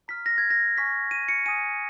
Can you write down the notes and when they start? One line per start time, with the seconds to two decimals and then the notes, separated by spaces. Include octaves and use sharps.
0.08 A#5 F6 B6
0.26 A#6
0.38 G#6
0.50 A#6
0.77 G#5 C#6 F6 B6
1.11 D#7
1.28 C#7
1.46 G#5 D#6 F#6 D#7